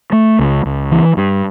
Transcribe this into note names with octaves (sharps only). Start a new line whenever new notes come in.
A3
C#2
C#2
E3
G2